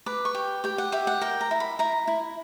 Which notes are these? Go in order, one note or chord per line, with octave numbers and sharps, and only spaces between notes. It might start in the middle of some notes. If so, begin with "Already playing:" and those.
B4 D6
C#6
G4
G4 G5
F#5
G4 E5
F#5
A#4 G5
A#5
E4
B5
E4 A#5
E4